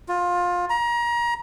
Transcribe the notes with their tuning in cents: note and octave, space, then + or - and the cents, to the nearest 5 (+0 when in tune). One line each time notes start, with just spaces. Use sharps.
F4 +20
A#5 +30